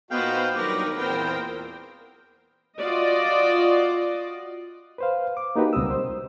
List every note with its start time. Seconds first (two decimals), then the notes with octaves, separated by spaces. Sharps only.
0.11 A#2 B3 D#4 F#4 B4 C5 F5 G5
0.55 G2 D#3 F#3 D#4 G4 A#4 B4
0.97 E2 A#2 B3 C4 A#4 C5 G5
2.79 F4 F#4 D5 D#5
4.98 B4 C5 F5
5.37 D6
5.56 A#3 D#4 F#4 G4 B4
5.73 C#2 B2 G3 C4 D#6 E6
5.90 C5